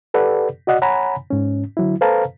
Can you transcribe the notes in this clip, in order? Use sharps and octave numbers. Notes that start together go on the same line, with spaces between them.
G4 A4 B4 D5 F#5
F#4 D5 D#5 F#5
C#5 F#5 G#5 A#5 B5
G#2 C#4
D3 F#3 E4
A4 B4 C5 F5 A5 A#5